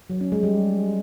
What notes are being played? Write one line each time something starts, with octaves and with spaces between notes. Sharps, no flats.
F#3
C#4
G#3
G3